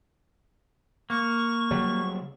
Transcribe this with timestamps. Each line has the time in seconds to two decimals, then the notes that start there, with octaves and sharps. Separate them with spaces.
1.10 A#3 C#6
1.71 C#3 F#3 G3